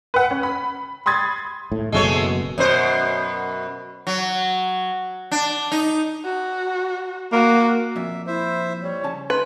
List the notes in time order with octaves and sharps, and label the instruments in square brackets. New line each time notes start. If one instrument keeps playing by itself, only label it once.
[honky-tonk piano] B4 F#5
C#4
B5
B5 C6 D#6 G#6 A6
[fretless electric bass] A2
[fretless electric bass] F#1 F#2 B2 [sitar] G#3 A3 C#5
[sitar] F#2 B2 C5
F#3
D4
D#4
[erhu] F#4
[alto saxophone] A#3 [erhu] F#4
[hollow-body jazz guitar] F2 A#2 [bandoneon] E5
[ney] E4 [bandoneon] C5 E5
[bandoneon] G3 [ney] C#5
[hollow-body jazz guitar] C#3 A5
[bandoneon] D#4 [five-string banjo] B4 [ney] C6